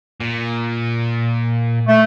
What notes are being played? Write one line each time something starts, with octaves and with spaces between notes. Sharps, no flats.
A#2
A3